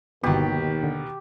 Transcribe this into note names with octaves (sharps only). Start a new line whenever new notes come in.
G1 D#2 B2 D#3 E3 B3 G4
D3